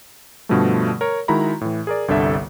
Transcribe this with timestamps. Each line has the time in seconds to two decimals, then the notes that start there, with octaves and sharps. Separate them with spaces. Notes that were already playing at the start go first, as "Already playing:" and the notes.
0.49 G2 B2 D3 F3 G3 A3
1.01 A#4 C#5
1.28 D#3 G#3 E4 F#4 A#5 B5
1.61 A2 E3
1.87 G#4 A#4 D5
2.08 G1 C2 D3 A4 E5